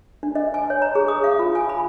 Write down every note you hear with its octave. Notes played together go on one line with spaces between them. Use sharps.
D4
D#5
G#5
C#5
A#5
G#4
D#6
F5
F4
G#5
B5